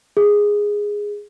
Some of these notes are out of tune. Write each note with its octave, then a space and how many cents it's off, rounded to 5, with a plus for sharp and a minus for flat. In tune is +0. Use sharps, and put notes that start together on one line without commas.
G#4 -5